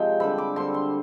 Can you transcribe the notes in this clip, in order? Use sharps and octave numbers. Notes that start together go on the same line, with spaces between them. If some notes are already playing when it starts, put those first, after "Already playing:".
Already playing: C3 F3 G#3 G5
D3 G3 C4 B5
D6
D3 G3 C4 C6
C6